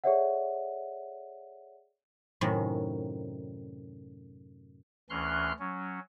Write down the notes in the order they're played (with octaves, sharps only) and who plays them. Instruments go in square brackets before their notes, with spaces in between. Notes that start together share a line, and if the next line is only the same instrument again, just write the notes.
[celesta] G#4 A4 C#5 D5 E5 F#5
[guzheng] F#2 A2 C3 D#3
[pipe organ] D2 E3 C#4 C6 F6 F#6
F#3 C#4